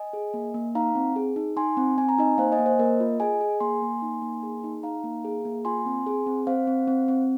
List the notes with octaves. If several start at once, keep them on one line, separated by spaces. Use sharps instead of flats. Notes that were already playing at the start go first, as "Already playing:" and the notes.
Already playing: D#5 G#5
G#4
A#3
A#3
D#4 F5 A#5
C4
G#4
D#4
D#4 G#5 C6
C4
C4 G#5
A#5
D#4 D#5 G#5
A#3 C5 F5
D#5 G#5
A#3
C5
A#3 A#4 D#5
F4
G#4 D#5 G#5
G#4
A#3 G#5 C6
A#3
D#4
A#3
G#4
D#4
D#4 F5 A#5
A#3
G#4
A#3
F4 G#5 C6
C4
G#4
C4
C4 C5 F5
C4
C4
C4